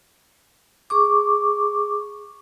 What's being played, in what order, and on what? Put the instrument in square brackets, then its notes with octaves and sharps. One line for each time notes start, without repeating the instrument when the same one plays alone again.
[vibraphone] G#4 C#6 D6